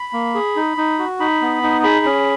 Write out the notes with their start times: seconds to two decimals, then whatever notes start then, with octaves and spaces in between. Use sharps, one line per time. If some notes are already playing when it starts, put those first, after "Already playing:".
Already playing: B5
0.13 A#3
0.35 G#4
0.56 D#4
0.77 D#4
0.99 F#4
1.20 D#4 B5
1.41 B3
1.63 D#4
1.84 G#4 B5
2.05 C#4